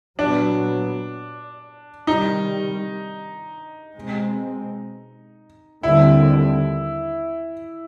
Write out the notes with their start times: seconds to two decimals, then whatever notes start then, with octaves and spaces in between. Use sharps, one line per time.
0.19 A#2 F#3 B3 D4
2.07 C3 D#3 G3 D#4
3.96 B2 G#3 C4
5.83 D#2 D3 G3 C4 E4